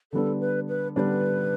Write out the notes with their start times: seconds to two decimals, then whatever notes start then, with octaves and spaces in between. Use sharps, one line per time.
0.13 D3 G3 B3 D4 A4
0.41 B4
0.69 B4
0.96 D3 G3 B3 D4 B4 C#5